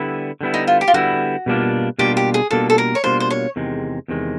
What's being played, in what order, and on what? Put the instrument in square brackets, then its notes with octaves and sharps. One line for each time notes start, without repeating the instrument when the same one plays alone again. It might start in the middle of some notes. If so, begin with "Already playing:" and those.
Already playing: [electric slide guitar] D3 G3 B3 E4
D3 G3 B3 E4
[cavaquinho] D#4
F4
G4
F4
[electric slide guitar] D3 G3 B3 E4 [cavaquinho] F#4
[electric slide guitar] B2 G3 A#3 D4 F4
[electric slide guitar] B2 G3 A#3 D4 F4 [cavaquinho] G4
[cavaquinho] G4
G#4
[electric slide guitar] B2 G3 A#3 D4 F4 [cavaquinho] A4
[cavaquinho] A4
A#4
C#5
[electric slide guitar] B2 G3 A#3 D4 F4 [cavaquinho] C5
[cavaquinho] C5
C#5
[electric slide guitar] E2 C3 D#3 G#3
E2 C3 D#3 G#3